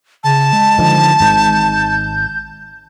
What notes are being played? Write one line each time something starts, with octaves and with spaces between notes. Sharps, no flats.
C#3 A5
G#3
D3 D#3 F3
G#1 G#2 G6